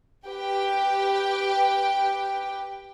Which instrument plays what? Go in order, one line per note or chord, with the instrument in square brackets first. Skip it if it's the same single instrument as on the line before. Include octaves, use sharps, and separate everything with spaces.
[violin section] G4 B4 G5